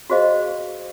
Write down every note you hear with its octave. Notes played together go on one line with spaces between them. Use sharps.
F#4 G#4 C5 D#5 F5